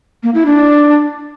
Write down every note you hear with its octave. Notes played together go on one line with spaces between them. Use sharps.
A#3
E4
D4